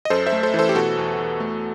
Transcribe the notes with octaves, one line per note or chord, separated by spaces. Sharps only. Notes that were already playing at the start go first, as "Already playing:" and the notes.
D#5
F#2 A4 C5
C5 E5
A3
A4 C5
E3
A4 C5
G4
B2 F#4 A4
E2
E2
A3